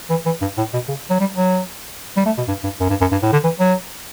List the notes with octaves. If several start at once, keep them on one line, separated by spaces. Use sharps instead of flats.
E3
E3
G2
A2
B2
C#3
F#3
G3
F#3
G3
A3
B2
G2
G2
F#2
G2
F#2
G2
A2
D3
E3
F#3